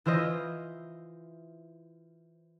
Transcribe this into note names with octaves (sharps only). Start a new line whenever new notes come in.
E3 E4 F4 C5 D#5